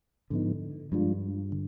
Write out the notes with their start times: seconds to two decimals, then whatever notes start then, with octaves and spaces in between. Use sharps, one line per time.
0.30 G#2 D3 F3 B3 D#4
0.92 G2 F3 G#3 D4 F4
1.52 D3